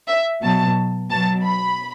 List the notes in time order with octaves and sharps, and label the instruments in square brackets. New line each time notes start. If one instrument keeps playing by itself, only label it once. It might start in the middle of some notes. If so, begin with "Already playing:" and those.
[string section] E5
B2 F#3 A5
B2 F#3 A5
B5